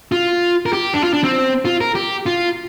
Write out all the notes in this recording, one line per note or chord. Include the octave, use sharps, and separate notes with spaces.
F4
A#4
G4
D4
F4
D4
C4
F4
A#4
G4
F4